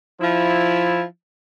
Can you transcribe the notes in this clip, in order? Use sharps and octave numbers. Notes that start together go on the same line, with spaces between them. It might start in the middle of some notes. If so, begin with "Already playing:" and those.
F3 E4